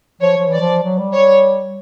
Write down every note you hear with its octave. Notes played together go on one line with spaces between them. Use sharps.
F3 C#5
F3
E3 D5
F3
F#3
G3
C#5